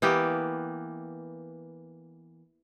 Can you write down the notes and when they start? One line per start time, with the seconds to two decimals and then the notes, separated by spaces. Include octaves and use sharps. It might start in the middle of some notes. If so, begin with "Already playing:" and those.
0.02 E3 A#3 B3 G4